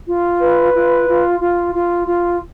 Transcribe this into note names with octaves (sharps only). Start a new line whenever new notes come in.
F4
B4
F4
F4
F4
F4
F4